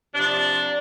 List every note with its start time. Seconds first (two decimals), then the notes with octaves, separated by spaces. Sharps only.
0.15 C3 F3 D4